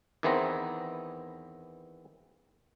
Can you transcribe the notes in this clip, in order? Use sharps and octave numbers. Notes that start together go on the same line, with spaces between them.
E2 D#3 E3 B3 C4 A#5